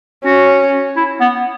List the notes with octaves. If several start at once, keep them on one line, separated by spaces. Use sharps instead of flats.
C#4 F#4
E4
B3